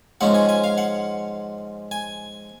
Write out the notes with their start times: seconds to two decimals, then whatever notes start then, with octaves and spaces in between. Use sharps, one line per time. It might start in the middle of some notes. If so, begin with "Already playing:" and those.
0.21 G#2 F3 G#3 C#4 F#5
0.34 G#5
0.49 G#5
0.64 F5
0.78 F#5
1.91 G#5